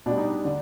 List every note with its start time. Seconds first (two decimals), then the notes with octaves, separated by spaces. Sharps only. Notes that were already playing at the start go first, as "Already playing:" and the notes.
0.06 B2 G3 D4
0.18 D#4
0.29 D4
0.45 D3 D4